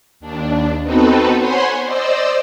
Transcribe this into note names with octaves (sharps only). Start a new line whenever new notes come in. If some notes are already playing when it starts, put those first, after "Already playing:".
D#2 D4
B3 C4 D#4 F#4 A4 B4
C5 C#5 F#5 G#5 B5 C6
C5 D5 D#5 E6